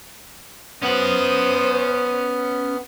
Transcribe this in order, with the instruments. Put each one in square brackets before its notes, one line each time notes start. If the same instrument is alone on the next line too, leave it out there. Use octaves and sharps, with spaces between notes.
[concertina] B3 [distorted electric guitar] C#4 F#5 [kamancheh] C5 D#6